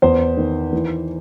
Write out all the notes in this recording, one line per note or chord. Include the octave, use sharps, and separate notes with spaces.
E2 C5
D#3
E3